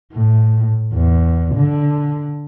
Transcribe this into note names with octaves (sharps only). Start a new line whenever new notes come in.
A2
E2
D3